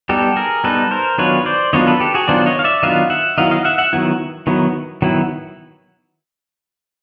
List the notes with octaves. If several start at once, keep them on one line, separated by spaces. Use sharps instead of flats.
G3 B3 D#4 G4 A4
G#4 A#4
G3 B3 D#4 A4 B4
A#4 C5
D#3 F#3 B3 D4 F4 B4 C#5
C5 D5
D#3 F#3 B3 D4 F4 C#5 D#5
A4 B4
G4 A4
F#4 G#4
D#3 F#3 B3 D4 F4 C5 D5
C#5 D#5
F5
D5 E5
D#3 F#3 B3 D4 F4 D#5 F5
E5 F#5
D#3 F#3 B3 E4 D#5 F5
D#5 F5
E5 F#5
E5 F#5
D#3 F#3 B3 E4
D#3 F#3 B3 E4
D#3 F#3 B3 E4